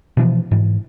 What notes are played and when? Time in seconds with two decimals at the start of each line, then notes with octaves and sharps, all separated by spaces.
0.17 B2 E3 F3
0.51 G#2 E3